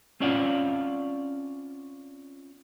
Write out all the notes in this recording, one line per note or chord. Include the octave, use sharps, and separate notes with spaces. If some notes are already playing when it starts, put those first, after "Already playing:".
C4 C#4 F4 D5 F5 F#5